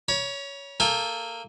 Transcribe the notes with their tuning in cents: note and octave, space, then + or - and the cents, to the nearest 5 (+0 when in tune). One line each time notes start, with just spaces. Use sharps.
C#5 +15 B5 -40
A#3 -15 A4 -25 G5 +40